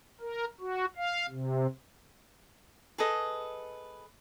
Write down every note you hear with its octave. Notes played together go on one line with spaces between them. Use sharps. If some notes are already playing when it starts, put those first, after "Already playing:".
A#4
F#4
F5
C3
G#4 A4 B4 D#5